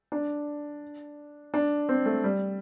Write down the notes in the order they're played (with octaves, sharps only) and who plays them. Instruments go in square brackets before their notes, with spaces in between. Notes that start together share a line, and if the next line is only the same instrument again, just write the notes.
[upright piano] D4
D4
C4
A3
G3